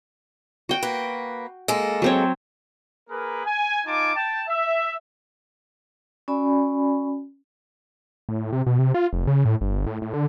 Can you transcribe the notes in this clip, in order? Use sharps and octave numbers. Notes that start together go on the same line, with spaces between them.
F#4 G5
A#3 B4
G#3 A#3 A4
F#3 C4 C#5
A#3 G#4 A#4 B4
G#5
D#4 F4 G#5 A5 D6
G5 A5
E5
C#4 F#4 D5 G#5 B5
A2
C3
B2
C3
F4
F1
C#3
A2
G1
A2
A2
D3